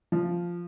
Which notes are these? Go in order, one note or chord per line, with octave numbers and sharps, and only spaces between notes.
F3